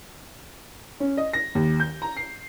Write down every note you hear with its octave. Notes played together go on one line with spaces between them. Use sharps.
C#4
D#5
A#6
D#2
G6
A#5
C7